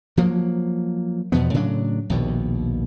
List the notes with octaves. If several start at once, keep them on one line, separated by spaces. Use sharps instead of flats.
F3 F#3 A#3
E2 B2 F3 B3
A2 C#3 F#3 D4
A#1 D#2 B2